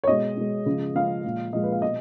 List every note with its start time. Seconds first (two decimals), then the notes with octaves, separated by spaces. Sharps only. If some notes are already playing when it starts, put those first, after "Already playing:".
0.04 C#5
0.07 B2 G#3 D#5
0.36 B2 G#3
0.66 C#3 F3 G#3
0.95 C#3 F3 G#3 F5
1.24 A#2 F3 G#3
1.53 A#2 F3 G#3 D#5
1.63 B4
1.72 F5
1.82 B2 D#5